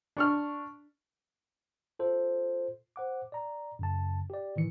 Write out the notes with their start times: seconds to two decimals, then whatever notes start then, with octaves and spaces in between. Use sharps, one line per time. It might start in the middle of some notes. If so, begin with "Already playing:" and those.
0.17 D4 C#6 F6
1.99 F4 A4 C5
2.96 C5 F#5 D6
3.32 D5 A#5
3.79 F#2 C#3 A5
4.30 G4 D5
4.56 A2 D#3 E3 C#7